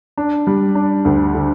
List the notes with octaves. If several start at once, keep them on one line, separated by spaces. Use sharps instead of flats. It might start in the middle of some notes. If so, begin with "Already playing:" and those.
D4
G3
D4
D2
D3